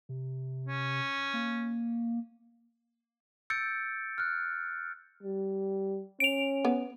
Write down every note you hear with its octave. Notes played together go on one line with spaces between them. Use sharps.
C3
C#4
A#3
E6 G6 A6 C#7 D7
F6 F#6
G3
C#4 D7 F7
B3